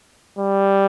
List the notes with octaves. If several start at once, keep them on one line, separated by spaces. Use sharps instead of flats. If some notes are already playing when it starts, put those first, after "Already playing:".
G3